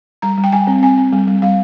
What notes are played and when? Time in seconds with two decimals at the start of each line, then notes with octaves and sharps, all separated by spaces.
0.22 G3 A#5
0.38 G3
0.44 G5
0.52 G3 G#5
0.67 C4
0.83 C4 G#5
0.98 C4
1.12 G3
1.27 G3
1.42 G3 F5